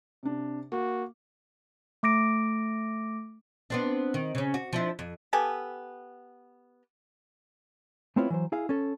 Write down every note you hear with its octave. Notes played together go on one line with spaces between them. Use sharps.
C3 D4
A#3 F#4
A3 D6 A#6 D7
B3 C4 D4
D#3
C#3 C#4
F#4
F3 D4 E4
F2
B3 G4 A4 G#5
A3 B3 C4 E4 F4 C#5
E3 F#3 C5
E4 G#4 F5
C#4 A4